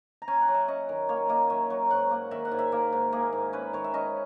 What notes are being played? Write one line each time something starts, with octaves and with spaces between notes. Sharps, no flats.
A#5
C#4 G#5
F#5
F#3
E5
C#4 D#5
D#3
A#3 C#5
A#3 D#5
F#3 E5
F#3
G#2 F#5
A#3
D#3 E5
F#5
G#2
E5
A#3 A#4
G#2
A#3 G#4
G#2
C#4 B4
D#3 C#5
E5
C#4 D#5